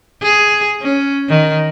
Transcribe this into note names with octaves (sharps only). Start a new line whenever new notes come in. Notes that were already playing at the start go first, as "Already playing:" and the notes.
G#4
C#4
D#3